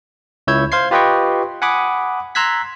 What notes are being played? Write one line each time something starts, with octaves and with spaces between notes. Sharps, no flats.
C#2 E4 C#5 E6 G6 G#6
C5 F5 C6 G#6 C7
F4 G4 B4 D#5 G5 C#6
F#5 G#5 B5 D6 D#6
A#5 C6 E6 F#6 G#6 B6